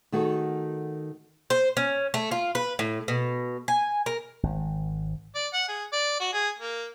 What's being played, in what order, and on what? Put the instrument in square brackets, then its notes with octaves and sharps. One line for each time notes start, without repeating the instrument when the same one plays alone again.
[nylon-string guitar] D#3 A3 F#4 G#4 A4
[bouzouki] C5
C#4
A3
F4
B4
A2
B2
G#5
A#4
[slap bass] G#1
[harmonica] D5
F#5
G#4
D5
F#4
G#4
A#3